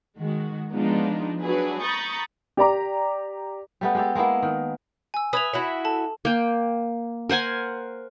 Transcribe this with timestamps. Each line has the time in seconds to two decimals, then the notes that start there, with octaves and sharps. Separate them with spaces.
0.18 D#3 G#3 F#4
0.71 F3 G#3 B3 D4 D#4 F4
1.43 F#3 D4 G#4 B4
1.83 A#5 B5 C#6 D#6 G6 A6
2.57 G4 D5 A#5 D6
3.81 G3 A3 B3
3.95 G#3 G4 A4
4.15 G#3 A#3 B3 E4
4.42 D#3
5.14 G#5 E6
5.33 B4 E5 D#6 G#6 F7
5.53 E4 F#4 E5
5.85 A4 A5
6.25 A#3 G5
7.29 A#4 C5 F#5 G#5